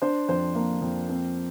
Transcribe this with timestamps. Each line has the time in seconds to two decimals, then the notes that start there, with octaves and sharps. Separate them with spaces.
0.02 D4 C5
0.29 F2 C5
0.55 A#3
0.82 F2
1.09 C4